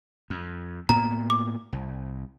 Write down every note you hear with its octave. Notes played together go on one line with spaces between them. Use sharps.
F2
A2 A#3 B3 A#5
D6
C2